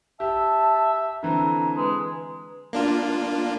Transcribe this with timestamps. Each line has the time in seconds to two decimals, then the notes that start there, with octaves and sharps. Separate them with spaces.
0.20 G4 E5 A5
1.23 D3 E3 C4 A#5
1.77 G#3 B4
2.73 A#3 D4 F4